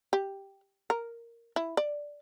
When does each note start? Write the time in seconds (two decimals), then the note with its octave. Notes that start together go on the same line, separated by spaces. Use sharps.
0.13 G4
0.90 A#4
1.56 E4
1.77 D5